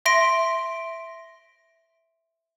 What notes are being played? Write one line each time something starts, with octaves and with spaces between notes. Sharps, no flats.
E5 C6 A#6 D7